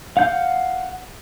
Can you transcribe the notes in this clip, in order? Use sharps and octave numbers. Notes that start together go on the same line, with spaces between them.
F5 F#5 G6